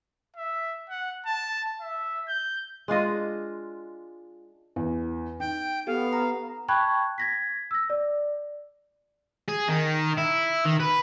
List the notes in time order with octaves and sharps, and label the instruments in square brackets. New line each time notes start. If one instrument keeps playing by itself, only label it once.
[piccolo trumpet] E5
F#5
A5
E5
G6
[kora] G#3 D4 F4 D#5
[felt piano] E2
[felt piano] D#4 [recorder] G5
[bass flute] B3 [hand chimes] G4 A4 [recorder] F5
[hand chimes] A#5
[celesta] G5 A5 B5 C#6 F#6 G#6
G#6 A#6 B6
E6 A#6
D5
[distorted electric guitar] G#4
D#3
E4
D#3
B4